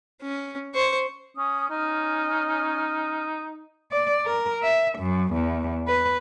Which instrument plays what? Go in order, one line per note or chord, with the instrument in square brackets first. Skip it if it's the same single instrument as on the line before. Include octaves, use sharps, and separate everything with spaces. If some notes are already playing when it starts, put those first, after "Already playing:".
[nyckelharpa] C#4
C5 C#6
[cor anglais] C#4 [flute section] D#6
[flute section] C#4 F6 [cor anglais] D#4
[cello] D5
A#4
E5
F#2
E2
B4